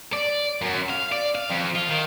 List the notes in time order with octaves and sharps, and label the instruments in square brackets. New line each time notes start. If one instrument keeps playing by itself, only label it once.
[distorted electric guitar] D5
F#2
F5
D5
F5
F2
F4
D#3